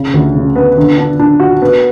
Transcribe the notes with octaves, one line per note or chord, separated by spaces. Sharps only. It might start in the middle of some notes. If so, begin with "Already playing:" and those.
Already playing: C#3
D2
C#3
B3
D3
D4
D4
F#4
B3